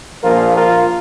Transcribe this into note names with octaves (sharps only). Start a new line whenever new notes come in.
A#1 A#2 F3 F4 A#4
F4 A#4